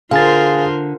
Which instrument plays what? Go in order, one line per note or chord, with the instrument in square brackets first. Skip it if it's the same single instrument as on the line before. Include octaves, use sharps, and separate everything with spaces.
[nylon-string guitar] D3 [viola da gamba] F4 A#4 C5 [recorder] G#4 [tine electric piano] F5 G#5 A6